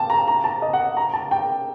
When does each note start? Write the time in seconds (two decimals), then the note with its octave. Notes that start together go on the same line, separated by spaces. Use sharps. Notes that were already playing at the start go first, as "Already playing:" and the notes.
Already playing: G5 A5
0.10 A#5
0.28 A#5
0.44 A5
0.62 D#5
0.73 F#5
0.97 A#5
1.14 A5
1.31 G5